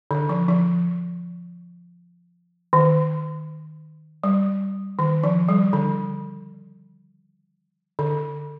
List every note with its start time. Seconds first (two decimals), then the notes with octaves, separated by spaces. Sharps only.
0.11 D3
0.29 F3
0.49 F3
2.73 D#3
4.24 G3
4.99 D#3
5.24 F3
5.49 G3
5.73 D3
7.99 D3